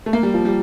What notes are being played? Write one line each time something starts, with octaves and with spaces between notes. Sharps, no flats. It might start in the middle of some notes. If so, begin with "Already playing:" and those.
A3
A#3
G3
F3
G3